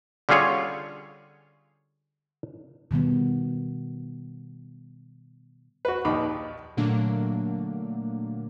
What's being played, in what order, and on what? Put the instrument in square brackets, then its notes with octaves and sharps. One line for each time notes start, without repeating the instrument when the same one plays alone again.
[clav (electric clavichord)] D3 G3 C#4 F4 G#4 C#5
[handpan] B2 D#3 G3 B3
[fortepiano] F#4 B4
A#1 D#2 D#3 D#4 B5 D6
[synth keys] A#2 D3 F#3 A3 A#3 D4